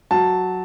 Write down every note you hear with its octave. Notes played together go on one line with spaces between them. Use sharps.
F#3 A5